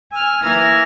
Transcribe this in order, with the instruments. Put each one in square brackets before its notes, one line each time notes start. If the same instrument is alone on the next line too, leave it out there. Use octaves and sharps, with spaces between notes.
[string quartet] G#5 E6 F6
E3 A#3 A#5 E6 F6 G#6